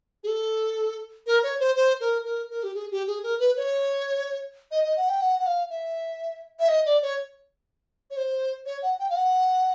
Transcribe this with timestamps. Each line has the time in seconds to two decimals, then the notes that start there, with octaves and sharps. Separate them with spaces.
0.24 G#4
0.28 A4
1.27 A#4
1.43 C#5
1.60 C5
1.76 C5
2.00 A#4
2.25 A#4
2.50 A#4
2.63 G4
2.74 G#4
2.91 G4
3.07 G#4
3.23 A#4
3.40 B4
3.57 C#5
4.71 D#5
4.84 D#5
4.97 F#5
5.09 G5
5.21 F#5
5.40 F#5
5.46 F5
5.70 E5
6.60 E5
6.68 D#5
6.86 D5
7.02 C#5
8.11 C#5
8.17 C5
8.66 C#5
8.83 F#5
8.99 G5
9.10 F5
9.16 F#5